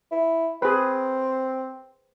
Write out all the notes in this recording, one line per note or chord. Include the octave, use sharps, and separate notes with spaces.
E4
C4 G#4 B4